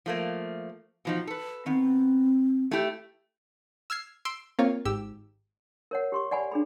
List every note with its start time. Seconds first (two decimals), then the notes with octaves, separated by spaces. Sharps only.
0.06 F3 A3 A#3
1.05 B2 F3 D#4
1.27 A4 B4
1.66 D#3 B3 C4
2.71 A3 E4 G4
3.90 E6 F6 G#6 C7
4.25 C6 E6 D7
4.59 A#3 C4 F4 C#5 F5
4.85 G#1 G#2 G4 E6
5.91 A#4 C#5 F#5
6.12 G4 C6 C#6
6.31 D5 F#5 G#5 B5
6.52 D4 G#4 B5